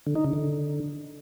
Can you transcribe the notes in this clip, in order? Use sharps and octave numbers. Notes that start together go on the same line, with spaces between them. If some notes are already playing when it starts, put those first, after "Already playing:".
D3
D#4
C#3
D3